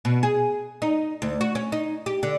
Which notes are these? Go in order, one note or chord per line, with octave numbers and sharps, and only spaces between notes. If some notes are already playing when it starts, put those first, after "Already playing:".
B2
G#4
D#4
D2
F#4
C#4
D#4
G4
D3